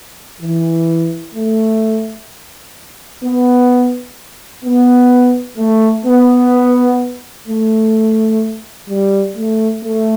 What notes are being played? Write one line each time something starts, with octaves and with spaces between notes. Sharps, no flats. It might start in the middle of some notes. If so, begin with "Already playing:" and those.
E3
A3
B3
B3
A3
B3
A3
G3
A3
A3